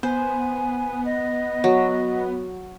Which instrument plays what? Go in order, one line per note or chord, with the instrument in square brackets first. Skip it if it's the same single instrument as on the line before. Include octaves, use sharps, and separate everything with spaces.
[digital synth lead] B3 [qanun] C5 [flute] G#5
[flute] D#5
[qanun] F#3